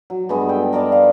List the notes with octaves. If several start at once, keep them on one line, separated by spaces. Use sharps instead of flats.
F#3
G2 G#3 B3
A4 G5
A#4 D5 D#5 A5
F5